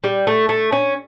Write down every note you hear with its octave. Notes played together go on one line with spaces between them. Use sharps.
G3
A3
A3
C#4